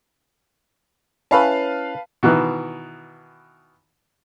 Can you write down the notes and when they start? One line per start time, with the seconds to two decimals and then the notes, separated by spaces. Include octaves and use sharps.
1.31 C#4 E4 B4 F5 A5
2.23 B2 D#3 E3